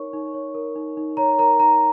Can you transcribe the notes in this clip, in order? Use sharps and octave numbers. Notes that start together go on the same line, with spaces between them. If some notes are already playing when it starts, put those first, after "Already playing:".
Already playing: D#4 A#4 C#5 C#6
D#4
C#5
A#4
D#4
D#4
C#5 A#5
A#4 A#5
D#4 A#5